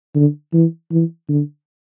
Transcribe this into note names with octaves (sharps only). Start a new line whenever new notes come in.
D3
E3
E3
D3